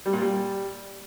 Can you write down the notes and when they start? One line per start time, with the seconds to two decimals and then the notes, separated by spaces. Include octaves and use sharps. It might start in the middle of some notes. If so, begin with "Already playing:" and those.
0.06 G3
0.13 A#2
0.21 G3